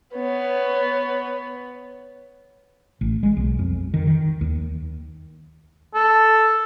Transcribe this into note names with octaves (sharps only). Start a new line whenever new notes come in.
B3 C#5
A1
G#3
B1
F2
D#3
D#3
D#2
A4